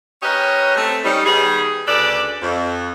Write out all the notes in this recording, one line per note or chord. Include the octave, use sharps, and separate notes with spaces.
C#4 G4 A#4 B4 C#5 D#5
A3 C4
G3 C#4 D#4
D#3 G3 B3 G4 G#4
D2 C#3 A4 B4 D5
F2